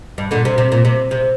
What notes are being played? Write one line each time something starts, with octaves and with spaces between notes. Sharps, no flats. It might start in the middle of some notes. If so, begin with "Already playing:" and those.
G2
A#2 D3
C3
C3
A#2
C3
C3